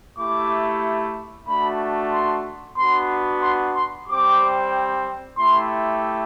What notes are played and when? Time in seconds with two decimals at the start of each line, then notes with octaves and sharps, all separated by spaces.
0.18 A3 E4 G4 D6
1.48 A3 D4 F#4 B5
2.13 C6
2.78 B3 D4 F#4 C6
3.43 C6
3.76 C6
4.08 G3 C4 G4 D6
5.38 A3 E4 G4 C6